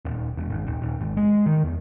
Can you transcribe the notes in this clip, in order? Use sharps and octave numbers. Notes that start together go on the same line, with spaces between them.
D#1
E1
G#1
D#1
D#1
G#1
G#3
D#3
E2